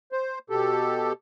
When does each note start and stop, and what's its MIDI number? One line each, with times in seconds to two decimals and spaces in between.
0.12 0.39 72
0.50 1.13 47
0.50 1.13 67
0.50 1.13 69